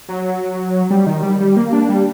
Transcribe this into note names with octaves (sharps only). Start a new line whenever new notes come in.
F#3
G3
D#3
G3
G3
A#3
D4
G3